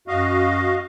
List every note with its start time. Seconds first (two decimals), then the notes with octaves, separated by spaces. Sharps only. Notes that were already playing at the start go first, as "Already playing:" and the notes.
0.08 F#2 F#4 D#5 F5